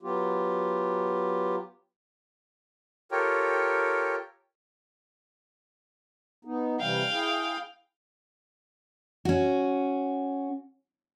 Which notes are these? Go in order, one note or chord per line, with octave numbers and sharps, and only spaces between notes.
F#3 B3 F4 G4
F4 G4 A4 A#4 C#5 G5
B3 D#4
C3 E3 G3 F5 G5
E4 G#4
C#4 F#4